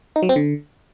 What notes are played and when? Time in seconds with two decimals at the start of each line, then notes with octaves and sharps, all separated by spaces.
0.16 D#4
0.23 F#3
0.29 C4
0.36 D3